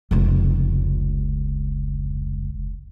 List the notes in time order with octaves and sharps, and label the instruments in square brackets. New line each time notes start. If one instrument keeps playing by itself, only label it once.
[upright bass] F1 C#2